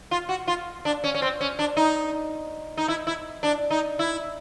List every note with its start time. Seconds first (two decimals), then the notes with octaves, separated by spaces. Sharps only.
0.11 F4
0.29 F#4
0.48 F4
0.85 D4
1.04 C#4
1.14 C#4
1.22 C4
1.41 C#4
1.59 D4
1.77 D#4
2.77 D#4
2.88 E4
3.07 E4
3.43 D4
3.70 D#4
3.99 E4